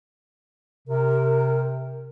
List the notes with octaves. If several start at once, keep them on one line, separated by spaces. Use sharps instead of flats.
C3 A#4